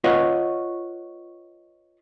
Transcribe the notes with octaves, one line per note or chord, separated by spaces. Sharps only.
F4 B4 C#5 D#5 F#5